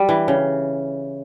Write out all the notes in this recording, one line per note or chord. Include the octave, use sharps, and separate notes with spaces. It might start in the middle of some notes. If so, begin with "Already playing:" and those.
Already playing: G3
E3
C#3